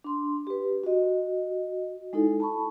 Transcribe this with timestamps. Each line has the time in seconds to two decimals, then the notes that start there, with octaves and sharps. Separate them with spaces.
0.04 D4 C6
0.47 G4 B4
0.84 F#4 D#5
2.13 G#3 D#4 E4 A4
2.40 A5 B5 C#6